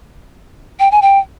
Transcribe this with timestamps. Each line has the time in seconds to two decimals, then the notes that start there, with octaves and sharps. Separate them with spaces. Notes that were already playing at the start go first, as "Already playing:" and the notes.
0.80 G5
0.92 G#5
1.02 G5